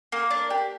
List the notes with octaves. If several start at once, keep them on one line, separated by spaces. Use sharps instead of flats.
A#3
D4
G4